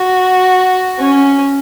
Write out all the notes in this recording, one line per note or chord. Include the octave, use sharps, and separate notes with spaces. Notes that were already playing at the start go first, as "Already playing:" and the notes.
Already playing: F#4
C#4